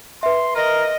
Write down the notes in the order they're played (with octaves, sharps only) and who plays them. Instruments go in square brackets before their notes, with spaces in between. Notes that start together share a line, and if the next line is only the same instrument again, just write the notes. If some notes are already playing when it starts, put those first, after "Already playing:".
[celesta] B4 E5 [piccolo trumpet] C6
[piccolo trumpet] A#4 [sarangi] D#5